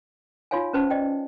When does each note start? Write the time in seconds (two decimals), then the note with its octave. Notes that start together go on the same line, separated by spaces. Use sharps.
0.51 D#4 F4 F#4 C#5 F5 G#5
0.73 C#4 B4 C5 A5
0.90 D5 D#5 G5